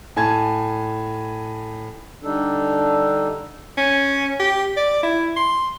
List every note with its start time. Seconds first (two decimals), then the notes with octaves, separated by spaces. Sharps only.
0.17 A2 G#5 A5 G#6
2.24 D3 G3 D4 D#4 A4
3.78 C#4
4.40 G4
4.77 D5
5.03 E4
5.36 C6